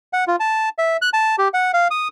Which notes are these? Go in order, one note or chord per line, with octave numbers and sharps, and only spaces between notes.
F#5
F4
A5
E5
F#6
A5
G4
F#5
F5
D#6